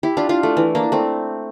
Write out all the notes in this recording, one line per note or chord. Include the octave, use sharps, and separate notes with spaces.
E4 G4
D4 F4
D4 F4
A3
E3
A#3 D4
A3 C4